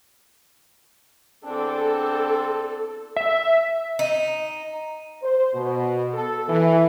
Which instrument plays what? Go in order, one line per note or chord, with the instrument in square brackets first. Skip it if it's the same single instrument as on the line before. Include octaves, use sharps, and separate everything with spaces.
[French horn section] E2 C4 D4 [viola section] A4
[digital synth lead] E5
[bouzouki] D#4
[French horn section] C5
B2
A4
E3